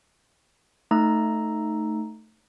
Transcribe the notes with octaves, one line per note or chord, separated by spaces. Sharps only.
A3 D#4 A#5 E6